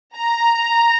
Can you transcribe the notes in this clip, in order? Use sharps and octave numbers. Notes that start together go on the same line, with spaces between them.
A#5